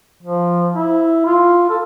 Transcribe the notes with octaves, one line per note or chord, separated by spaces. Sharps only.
F3
E4
F4
A4